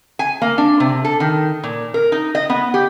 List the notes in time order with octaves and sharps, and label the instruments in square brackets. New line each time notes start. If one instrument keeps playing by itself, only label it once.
[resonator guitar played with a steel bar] G#5
A#3
D4
C3
A4
D#3
A#2
A#4
D#4
D#5
B3
G4